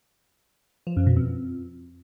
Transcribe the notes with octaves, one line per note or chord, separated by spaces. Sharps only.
F3
F#2
B2
F2